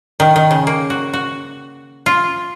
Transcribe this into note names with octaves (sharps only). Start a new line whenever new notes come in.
D#3
D#3
C#3
A#3
F#4
F#4
F4